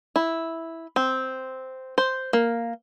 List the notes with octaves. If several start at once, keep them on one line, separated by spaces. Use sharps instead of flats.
E4
C4
C5
A#3